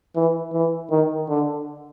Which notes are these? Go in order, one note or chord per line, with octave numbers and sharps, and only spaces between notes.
E3
E3
D#3
D3